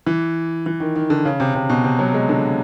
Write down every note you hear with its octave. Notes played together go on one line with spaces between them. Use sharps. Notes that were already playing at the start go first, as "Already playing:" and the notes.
E3
E3
D#3
D#3
D3
C#3
C3
C3
B2
C3
F#3
G#3
D3